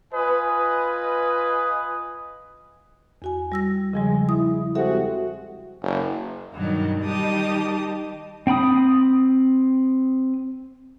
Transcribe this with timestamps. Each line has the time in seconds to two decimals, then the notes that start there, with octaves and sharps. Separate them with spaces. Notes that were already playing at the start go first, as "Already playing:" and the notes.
0.14 F4 B4 D#5 G#5 D#6
3.22 E2 F#4 G#5
3.52 G3 E6 A#6
3.94 C#3 F3 G3 G#3
4.29 E4 D#6
4.75 G#3 C4 F#4 G4 A4 E5
5.82 F#1
6.53 G2 B2 D#3 F#3
7.01 D#3 G3 D#4 G4 A5 D#6
8.47 C4 G5 B5 D#6